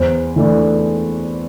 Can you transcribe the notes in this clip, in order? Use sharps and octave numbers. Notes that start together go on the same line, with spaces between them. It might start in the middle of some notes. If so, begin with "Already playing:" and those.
Already playing: E2 C5
E3 A3 D4